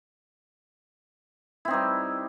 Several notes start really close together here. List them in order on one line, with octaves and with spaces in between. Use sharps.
E4 C4 D#4 G3